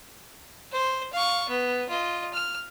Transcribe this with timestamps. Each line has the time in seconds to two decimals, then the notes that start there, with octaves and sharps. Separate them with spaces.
0.72 C5
1.13 F5 C#6
1.49 B3
1.89 F4 D#5
2.33 F6